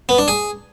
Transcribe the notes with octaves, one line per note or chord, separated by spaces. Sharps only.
B3
D4
G#4